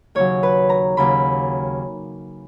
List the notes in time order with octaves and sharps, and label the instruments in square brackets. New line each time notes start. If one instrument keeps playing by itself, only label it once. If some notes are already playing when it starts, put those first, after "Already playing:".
[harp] D#2 C#3 F#3 C#5
B4
A#5
D#2 C#3 F#3 B5